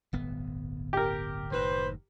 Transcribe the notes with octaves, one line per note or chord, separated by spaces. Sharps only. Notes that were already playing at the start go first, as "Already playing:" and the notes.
D1 G1 B3
G4 A#4
F#1 A2 D#3 B4 C5